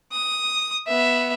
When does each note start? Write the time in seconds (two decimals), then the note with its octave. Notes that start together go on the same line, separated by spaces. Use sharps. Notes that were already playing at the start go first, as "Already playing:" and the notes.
0.12 D#6
0.87 B3 E5